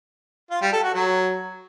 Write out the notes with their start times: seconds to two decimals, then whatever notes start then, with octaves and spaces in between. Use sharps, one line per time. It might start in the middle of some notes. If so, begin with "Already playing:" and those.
0.51 F4
0.61 G3
0.72 A4
0.83 F#4
0.94 F#3